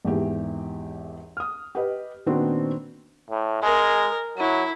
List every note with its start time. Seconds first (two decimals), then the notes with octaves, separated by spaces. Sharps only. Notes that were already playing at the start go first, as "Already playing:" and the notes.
0.05 G#1 E2 E3 G4
1.37 D#6 F6
1.75 G4 B4 D#5
2.26 A#2 D#3 B3 C4 D4 F#4
3.30 A2
3.63 G#3 A#4
4.38 F#3 E4